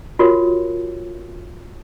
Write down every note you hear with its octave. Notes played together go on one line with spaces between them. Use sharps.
F4 F#4 A#4 C#5